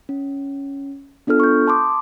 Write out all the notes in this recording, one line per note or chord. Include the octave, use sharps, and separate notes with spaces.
C#4
B3 D4 F4 A4 F6
C#6 G6
A5 C6 D6 D#6